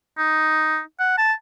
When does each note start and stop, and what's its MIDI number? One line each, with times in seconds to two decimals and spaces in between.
0.18 0.80 63
0.99 1.16 78
1.18 1.33 81